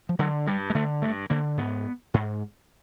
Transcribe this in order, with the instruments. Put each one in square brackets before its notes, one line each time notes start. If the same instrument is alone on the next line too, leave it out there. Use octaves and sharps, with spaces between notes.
[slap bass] F3
D3 F#3
G2 G3
G#3
D3 A3
G2 A3
D3 A#3
G#2 B3
G#2